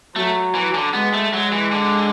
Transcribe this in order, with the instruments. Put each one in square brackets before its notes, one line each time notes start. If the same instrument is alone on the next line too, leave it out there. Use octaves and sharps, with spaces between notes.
[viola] F#3 [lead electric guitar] A3
[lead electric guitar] E3
D3
[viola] G#3 [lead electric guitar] B3
[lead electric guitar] A3
[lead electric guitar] F#3 [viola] G#3
[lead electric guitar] E3
D3